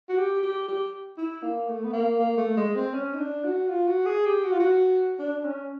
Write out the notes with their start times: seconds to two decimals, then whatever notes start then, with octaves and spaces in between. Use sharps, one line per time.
0.09 F#4
0.18 G4
0.43 G4
0.68 G4
1.18 E4
1.43 A#3
1.68 A3
1.84 B3
1.93 A#3
2.19 A#3
2.37 A3
2.57 G#3
2.75 C4
2.94 C#4
3.14 D#4
3.19 D4
3.44 F#4
3.69 F4
3.87 F#4
4.06 G#4
4.26 G4
4.44 F#4
4.52 F4
4.60 F#4
5.19 D4
5.44 C#4